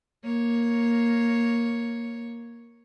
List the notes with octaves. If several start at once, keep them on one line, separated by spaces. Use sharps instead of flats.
A#3 C#5